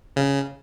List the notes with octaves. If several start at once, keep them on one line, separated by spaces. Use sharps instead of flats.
C#3